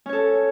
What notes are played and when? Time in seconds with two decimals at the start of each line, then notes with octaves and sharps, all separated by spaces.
0.06 C#4
0.09 C#5
0.13 A4